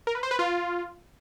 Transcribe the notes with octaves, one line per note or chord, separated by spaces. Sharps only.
A#4
B4
C5
B4
F4